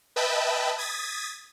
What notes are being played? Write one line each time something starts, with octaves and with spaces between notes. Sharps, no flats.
B4 D#5 E5 G5 A5 B5
D#6 G#6 A6 B6